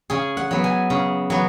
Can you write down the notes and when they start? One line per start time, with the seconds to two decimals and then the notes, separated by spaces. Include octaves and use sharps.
0.10 C#3 G#4
0.37 F#5
0.51 F#3 B3
0.64 G#5
0.90 C#3
1.30 F#3 B3